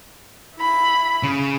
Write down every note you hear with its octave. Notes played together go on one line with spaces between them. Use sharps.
E4 B5
C#3